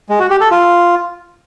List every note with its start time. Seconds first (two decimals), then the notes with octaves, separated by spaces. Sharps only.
0.09 G#3
0.20 F#4
0.30 G4
0.41 A4
0.51 F4